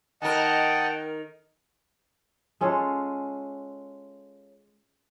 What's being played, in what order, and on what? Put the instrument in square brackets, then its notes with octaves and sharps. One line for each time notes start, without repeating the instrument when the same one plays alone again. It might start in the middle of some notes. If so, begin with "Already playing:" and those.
[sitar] D#3 A#4 [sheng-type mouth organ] D#5 F#5 A5 [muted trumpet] G5
[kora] G#3 C#4 F4 A4